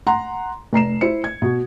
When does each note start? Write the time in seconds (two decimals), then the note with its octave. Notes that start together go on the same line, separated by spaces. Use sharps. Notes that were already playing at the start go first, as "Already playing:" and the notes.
0.07 F#5 A#5 C6
0.73 F1 A#5 C7 E7
1.01 E4 C5 C#7
1.24 G#6
1.42 B2